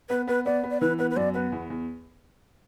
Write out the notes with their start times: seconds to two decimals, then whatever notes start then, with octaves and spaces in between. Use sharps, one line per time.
0.09 B3 B4
0.27 B3 B4
0.45 B3 D5
0.63 B3
0.71 D5
0.81 E3 B4
0.98 B3 B4
1.10 B4
1.17 F#2 D5
1.34 B3 B4
1.52 E2
1.70 E2